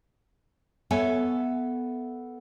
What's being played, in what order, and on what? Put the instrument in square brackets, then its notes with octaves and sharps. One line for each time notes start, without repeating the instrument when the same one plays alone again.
[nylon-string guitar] B3 A4 C#5 E5 G#5